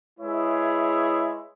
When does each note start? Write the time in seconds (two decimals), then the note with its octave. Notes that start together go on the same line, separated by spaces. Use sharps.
0.19 G#3 E4 G#4 B4 C#5 E5